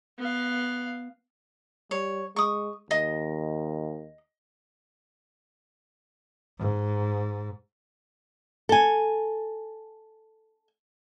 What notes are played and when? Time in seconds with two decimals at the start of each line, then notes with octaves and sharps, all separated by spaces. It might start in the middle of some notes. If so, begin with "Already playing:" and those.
0.19 B3 F5
1.91 G3 C#5
2.36 G#3 C#6 D#6
2.91 D#2 D#5
6.58 G#2
8.69 A4 G#5